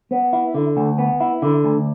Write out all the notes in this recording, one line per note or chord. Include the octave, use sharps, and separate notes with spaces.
B3
E4
D3
D2
B3
E4
D3
D2